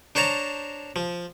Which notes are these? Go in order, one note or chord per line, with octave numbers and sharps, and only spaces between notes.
D4 C5 C#5 A5 A#5
F3